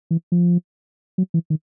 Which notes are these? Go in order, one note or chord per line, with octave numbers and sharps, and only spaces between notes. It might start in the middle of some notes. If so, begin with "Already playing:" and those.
E3
F3
F#3
E3
D#3